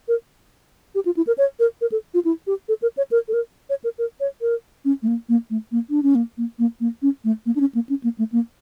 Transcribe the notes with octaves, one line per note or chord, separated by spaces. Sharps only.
A#4
G4
F4
E4
A#4
C#5
A#4
A#4
A4
F4
E4
G4
A4
A#4
C#5
A#4
A4
A#4
C#5
A#4
A#4
C#5
A#4
C#4
A3
A#3
A#3
A3
A#3
D4
C#4
A#3
A#3
A#3
A#3
C#4
A3
A#3
D4
C#4
A#3
C#4
A#3
A3
A#3